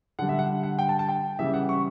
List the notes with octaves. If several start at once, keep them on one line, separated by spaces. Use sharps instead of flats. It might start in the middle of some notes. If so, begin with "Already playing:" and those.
D3 G3 F#5
E5
F#5
F#5
G5
A5
A5
G5
C#3 E3 G3 E5
F#5
C#6